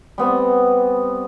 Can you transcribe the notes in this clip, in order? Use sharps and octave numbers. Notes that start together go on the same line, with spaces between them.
G3 B3 C4